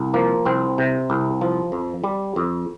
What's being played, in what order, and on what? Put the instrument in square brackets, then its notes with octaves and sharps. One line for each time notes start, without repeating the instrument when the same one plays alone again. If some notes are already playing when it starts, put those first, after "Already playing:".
Already playing: [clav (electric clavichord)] C2
F3 A#3
C2 C4
C3
C2
F3
F2
G3
F2